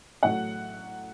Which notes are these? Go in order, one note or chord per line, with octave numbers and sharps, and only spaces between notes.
A2 F#3 A3 F#5